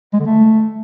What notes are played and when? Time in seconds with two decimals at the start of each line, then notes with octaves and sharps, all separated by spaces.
0.13 G#3
0.19 D3
0.26 A3